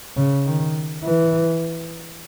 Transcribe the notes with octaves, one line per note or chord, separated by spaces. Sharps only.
C#3
D#3
E3